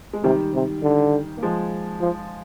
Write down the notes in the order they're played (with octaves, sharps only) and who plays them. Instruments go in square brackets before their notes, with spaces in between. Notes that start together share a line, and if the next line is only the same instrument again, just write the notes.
[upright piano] G#3
[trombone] C3 [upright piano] D#3 G3
[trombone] C3
D3
[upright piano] A#3
F3 G#3
[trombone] F3